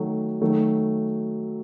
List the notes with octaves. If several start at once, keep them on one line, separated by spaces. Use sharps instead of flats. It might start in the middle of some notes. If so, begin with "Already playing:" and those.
Already playing: D#3 F#3 A3
D#3 F#3 A3